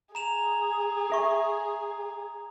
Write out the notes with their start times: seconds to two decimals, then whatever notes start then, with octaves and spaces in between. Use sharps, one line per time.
0.15 G#4 A#5 E7 F7
1.10 A4 E5 C#6